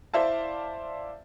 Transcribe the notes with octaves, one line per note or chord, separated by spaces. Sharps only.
E4 C5 D5 E5 F5 A5